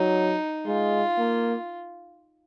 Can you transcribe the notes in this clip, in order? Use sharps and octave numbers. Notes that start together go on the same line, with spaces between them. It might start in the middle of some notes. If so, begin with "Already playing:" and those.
Already playing: F#3 D#4
G#3 F4
A#3